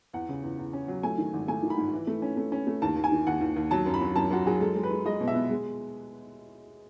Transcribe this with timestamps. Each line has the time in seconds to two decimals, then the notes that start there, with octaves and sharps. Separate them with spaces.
0.13 E2 F#5
0.29 C#3
0.43 E2
0.58 E2
0.73 C#4
0.88 F#3
1.03 A3 G#5
1.18 D#3
1.33 G#1
1.48 A3 G#5
1.63 D#3
1.70 B5
1.77 G#2
1.93 E3
2.07 A3
2.22 C#4
2.37 A3
2.52 C#4
2.67 A3
2.82 D#2 A5
2.96 D#2
3.04 G#5
3.12 D#3
3.27 D#2 F#5
3.41 D#2
3.56 D#2
3.71 F#3 A5
3.86 F#2
3.94 B5
4.01 F#3
4.16 F#2 A5
4.30 F#2 F#4
4.46 F#3 G#4
4.61 G#3 A4
4.76 G#3
4.83 B4
4.91 G#3
5.05 G#3 D#5
5.21 B2
5.28 E5
5.34 B3
5.50 G#3